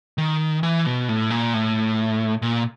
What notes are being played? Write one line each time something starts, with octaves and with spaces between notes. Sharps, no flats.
D#3
E3
B2
A2
A#2
A2
A#2